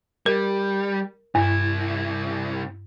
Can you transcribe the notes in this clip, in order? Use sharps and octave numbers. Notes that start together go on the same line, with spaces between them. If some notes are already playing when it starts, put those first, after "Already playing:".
G3 A#4
C2 G2 E4